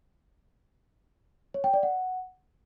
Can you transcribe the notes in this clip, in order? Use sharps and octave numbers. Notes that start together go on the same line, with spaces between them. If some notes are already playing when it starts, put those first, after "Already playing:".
C#5
G5
D5
F#5